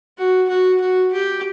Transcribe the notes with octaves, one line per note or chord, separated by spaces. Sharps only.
F#4
F#4
F#4
G4